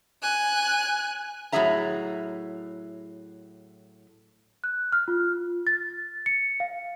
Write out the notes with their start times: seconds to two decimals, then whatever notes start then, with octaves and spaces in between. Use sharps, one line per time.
0.22 G#5 F#6
1.52 A2 F#3 C#4 G#4 E5 A#5
4.64 F#6
4.92 F6
5.08 F4
5.67 A6
6.26 C#7
6.60 F5